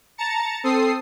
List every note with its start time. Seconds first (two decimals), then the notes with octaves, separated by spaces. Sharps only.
0.18 A5 A#5 A6 C#7
0.64 C4 A4 D#6 C7